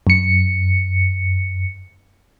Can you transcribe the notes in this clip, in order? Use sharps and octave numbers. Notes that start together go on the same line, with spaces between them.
F#2 C#7